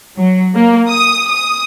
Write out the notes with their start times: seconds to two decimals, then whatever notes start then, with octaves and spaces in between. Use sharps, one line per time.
0.17 F#3
0.55 A#3
0.89 D#6
1.28 D#6